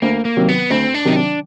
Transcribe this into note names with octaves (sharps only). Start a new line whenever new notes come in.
D2 A#3
A#3
C3 D#3 F#3
B3
D2 C4
D4
C3 D#3 F#3 D#4
D4